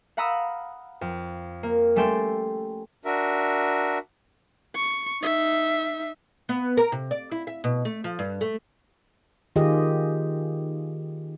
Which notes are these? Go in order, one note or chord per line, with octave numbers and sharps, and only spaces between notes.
F5 F#5 A#5 B5 D#6 E6
F2
A#3
G3 A3 C#4 A4 G5 C6
D4 F#4 A#4 E5
C#6
D#4 E5
B3
A#4
C3
D5
E4
E5
B2
A3
F3
G2
A3
D#3 F4 G4 G#4 D#5